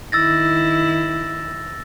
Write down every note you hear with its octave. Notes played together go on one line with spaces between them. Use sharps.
D#3 E4 E6 A6 A#6